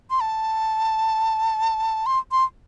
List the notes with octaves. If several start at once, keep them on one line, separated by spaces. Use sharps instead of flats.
C6
A5
C6
C6